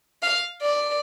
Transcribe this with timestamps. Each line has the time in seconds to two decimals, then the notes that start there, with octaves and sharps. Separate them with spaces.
0.22 F5
0.61 D5